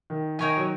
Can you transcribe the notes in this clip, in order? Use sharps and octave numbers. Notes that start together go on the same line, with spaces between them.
D#3
D#3 D#4 A#4 C#5 G#5
F#3